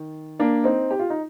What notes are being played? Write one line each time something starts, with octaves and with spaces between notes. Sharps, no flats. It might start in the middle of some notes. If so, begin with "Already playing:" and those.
Already playing: D#3
A#3 D4
C4 D#4
G4
F4
D#4